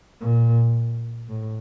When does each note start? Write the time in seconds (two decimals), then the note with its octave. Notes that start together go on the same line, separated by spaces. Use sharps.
0.21 A#2
1.29 A2